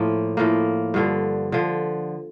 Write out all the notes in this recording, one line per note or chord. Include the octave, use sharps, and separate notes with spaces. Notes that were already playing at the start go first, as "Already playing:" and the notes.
Already playing: A2 F3 A#3
A2 F3 A#3
G2 D3 F3
D3 F3